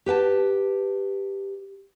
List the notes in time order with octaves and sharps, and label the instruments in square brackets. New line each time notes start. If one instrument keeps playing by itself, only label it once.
[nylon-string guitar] G4 B4 G5 A5